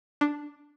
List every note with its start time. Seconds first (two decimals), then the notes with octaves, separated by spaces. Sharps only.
0.21 D4